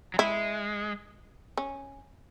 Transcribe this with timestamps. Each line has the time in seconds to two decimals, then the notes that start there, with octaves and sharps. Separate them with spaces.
0.14 F#3
0.19 G#3 E4
1.57 C#4